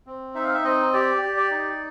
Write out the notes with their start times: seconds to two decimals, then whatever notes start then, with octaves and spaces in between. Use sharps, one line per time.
0.06 C4
0.35 D#4 E5
0.44 F5
0.54 E5
0.64 C4 D#5
0.93 G4 D5
1.22 G4
1.37 D5
1.51 D#4